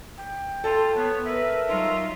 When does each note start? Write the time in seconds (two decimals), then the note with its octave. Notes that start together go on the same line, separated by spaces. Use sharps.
0.18 G5
0.64 F4 A4 A5
0.95 B3 C#5
1.26 A#4 B4 E5
1.68 F#3 D#4 F4